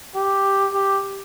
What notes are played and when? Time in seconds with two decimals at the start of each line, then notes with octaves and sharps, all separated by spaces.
0.16 G4
0.74 G4